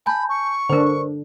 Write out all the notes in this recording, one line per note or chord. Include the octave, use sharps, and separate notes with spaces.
G#5 A5 B5 G6
C#6
D3 D4 A#4 C5